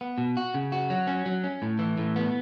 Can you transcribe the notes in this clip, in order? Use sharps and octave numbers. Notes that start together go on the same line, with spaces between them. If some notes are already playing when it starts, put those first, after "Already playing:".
B3
B2
F#4
C#3
F#4
F#3
C#4
F#3
C#4
A2
E3
A2
B3